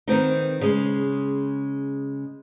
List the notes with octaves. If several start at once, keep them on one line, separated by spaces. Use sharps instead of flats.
D#3 B3 C4 D#4
C#3 G#3